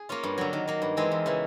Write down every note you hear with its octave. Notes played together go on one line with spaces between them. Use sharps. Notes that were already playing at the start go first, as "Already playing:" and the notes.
Already playing: G#4
A#3 C#4 F4
G2
D3 F#3
D#3
F#3 A#3
G2
E3 G#3 C4
E2
C#3 E3